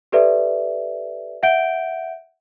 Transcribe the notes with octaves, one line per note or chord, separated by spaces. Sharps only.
G4 A4 B4 D5 E5
E5 F#5 G6 D7 G7